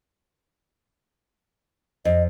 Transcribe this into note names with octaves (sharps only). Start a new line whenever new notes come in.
F2 D#5